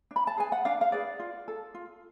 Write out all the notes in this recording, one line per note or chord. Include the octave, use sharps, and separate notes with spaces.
D4
B5
A5
G#4 B4 G#5
F#5
D4 F5
F5
G#4 B4 D5
F4
A4
F4